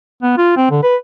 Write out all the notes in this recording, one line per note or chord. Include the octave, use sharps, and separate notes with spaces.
B3
F4
C4
D3
B4